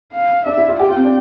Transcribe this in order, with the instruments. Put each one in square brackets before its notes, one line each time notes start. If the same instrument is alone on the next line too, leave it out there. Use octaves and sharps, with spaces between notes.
[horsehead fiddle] F5
[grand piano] D4 [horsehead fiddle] E5
[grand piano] E4
F4
[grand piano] G4 [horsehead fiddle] G5
[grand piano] F4
C4
D4